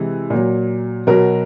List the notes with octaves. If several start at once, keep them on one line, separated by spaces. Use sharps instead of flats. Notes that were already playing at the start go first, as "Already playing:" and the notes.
Already playing: C3 E3 G#3
A#2 F#3
B2 F#3 A#4